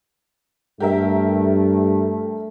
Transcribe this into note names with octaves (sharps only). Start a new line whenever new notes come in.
G2 A3 G4 A#4 E5